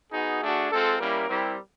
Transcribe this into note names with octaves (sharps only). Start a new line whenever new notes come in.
B3 D#4 F#4 G#4
A3 D4 F#4
G#3 C4 F4 A4
G3 A#3 C#4 E4 A#4
G3 C4 E4 G4